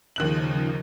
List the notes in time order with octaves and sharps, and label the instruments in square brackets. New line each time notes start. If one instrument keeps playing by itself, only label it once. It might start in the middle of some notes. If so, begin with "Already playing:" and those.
[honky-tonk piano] D#2 F#6 F#7 [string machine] C#3 F3 D#4